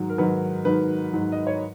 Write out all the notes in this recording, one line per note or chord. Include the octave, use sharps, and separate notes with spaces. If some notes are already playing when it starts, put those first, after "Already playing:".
Already playing: G#2 D#3 F#3
A#4
G#2 D#3 F#3 B4
G#2 D#3 F#3 B4
G#2 D#3 F#3
D#5
C#5